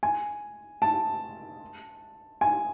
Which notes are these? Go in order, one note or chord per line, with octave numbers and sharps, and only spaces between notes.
G#5
A5
G#5